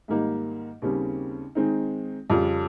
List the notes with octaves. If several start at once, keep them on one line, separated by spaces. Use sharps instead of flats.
G#2 D#3 G3 A#3 D#4
D#2 C#3 G3 C4
D#3 G#3 C4 D#4
F2 C#3 G3 C#4 F4